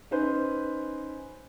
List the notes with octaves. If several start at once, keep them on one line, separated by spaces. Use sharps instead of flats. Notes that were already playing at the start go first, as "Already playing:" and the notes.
C#4 D#4 B4 C5